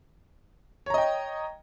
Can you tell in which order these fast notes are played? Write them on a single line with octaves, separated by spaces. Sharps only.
C#5 A#5 D#5 G5